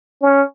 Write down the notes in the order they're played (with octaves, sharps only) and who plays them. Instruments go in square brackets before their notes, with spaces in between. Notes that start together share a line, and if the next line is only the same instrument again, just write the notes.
[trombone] C#4